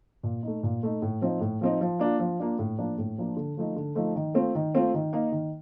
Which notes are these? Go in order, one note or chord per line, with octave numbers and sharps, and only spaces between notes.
A#2
A3 D#4
A#2
A3 D#4
A2
F3 C4 D#4
A2
F3 C4 D#4
F3
A#3 D4 F4
F3
A#3 D4 F4
A2
F3 A#3 D4 F4
A2
F3 A#3 D4 F4
D3
F3 A3 D#4
D3
F3 A3 D#4
D#3
A3 C4 F4
D#3
A3 C4 F4
D#3
A#3 D#4
D#3